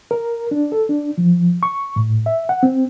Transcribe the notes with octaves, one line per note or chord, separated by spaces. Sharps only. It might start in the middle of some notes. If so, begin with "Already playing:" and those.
A#4
D4
A4
D4
F3
C#6
A2
E5
F#5
C4